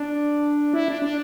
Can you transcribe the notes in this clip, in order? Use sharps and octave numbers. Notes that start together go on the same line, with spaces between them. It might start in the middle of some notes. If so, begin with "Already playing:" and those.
Already playing: D4
E4
D4
D4